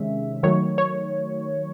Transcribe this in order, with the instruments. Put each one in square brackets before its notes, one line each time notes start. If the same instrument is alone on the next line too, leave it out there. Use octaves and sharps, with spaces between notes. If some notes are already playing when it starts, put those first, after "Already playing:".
Already playing: [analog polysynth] C3 D#3 G#3 C#4 E5
D#3 F#3 A3 C#5
C#5